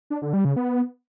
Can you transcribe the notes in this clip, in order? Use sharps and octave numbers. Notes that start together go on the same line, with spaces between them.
D4
D3
G3
C#3
B3